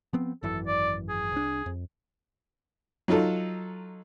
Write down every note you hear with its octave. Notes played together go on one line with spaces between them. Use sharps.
F3 B3 C4
G#1 F#2 E3 A4
D5
G#4
C2 D4
F2
F#3 D#4 F4 A4